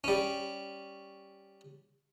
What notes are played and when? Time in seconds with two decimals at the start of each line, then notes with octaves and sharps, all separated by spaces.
0.04 G3 C#4